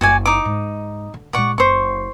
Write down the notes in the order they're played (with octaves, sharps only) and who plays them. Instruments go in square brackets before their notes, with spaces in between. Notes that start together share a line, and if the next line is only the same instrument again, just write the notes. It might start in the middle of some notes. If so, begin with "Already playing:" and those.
[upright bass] F#1 [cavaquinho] F#4 D5 G#5
[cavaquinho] D#4 D6
[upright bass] G#2
D3
[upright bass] A#2 G#3 [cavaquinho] D5 F#5 C#6
[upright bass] F#1 [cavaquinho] C5 C#6